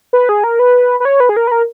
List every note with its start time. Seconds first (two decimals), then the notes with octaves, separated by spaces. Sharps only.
0.13 B4
0.29 G#4
0.44 A#4
0.59 B4
1.00 B4
1.05 C#5
1.20 B4
1.29 G#4
1.36 A#4
1.47 B4
1.52 A#4